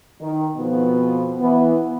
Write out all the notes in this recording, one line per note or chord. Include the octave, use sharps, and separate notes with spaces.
D#3
F2 B2 F3 B3
E3 B3